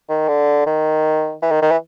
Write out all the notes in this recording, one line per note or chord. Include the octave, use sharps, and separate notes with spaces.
D#3
D3
D#3
E3
D#3
D#3
E3